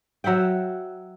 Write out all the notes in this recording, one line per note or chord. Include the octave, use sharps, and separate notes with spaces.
F#3 E5 F#5 G5